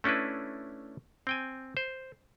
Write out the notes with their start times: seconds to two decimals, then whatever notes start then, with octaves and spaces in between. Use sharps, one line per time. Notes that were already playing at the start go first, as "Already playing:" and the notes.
0.04 A3 C#4 D4 E4 B4
1.27 C4 G5 G#5
1.77 C5